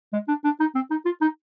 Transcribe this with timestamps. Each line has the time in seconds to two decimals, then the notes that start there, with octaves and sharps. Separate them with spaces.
0.13 G#3
0.28 D4
0.44 D4
0.60 D#4
0.75 C4
0.90 D#4
1.05 F4
1.21 D#4